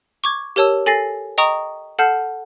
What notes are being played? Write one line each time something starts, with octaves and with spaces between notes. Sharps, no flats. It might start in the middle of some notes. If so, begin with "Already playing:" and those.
C#6 D6 G#6
G4 A#4 C#5 A5 E6
A4 G#5 A6 A#6 C7
D#5 G5 A#5 C#6 D#6
A4 F#5 A5 F6 G6 C7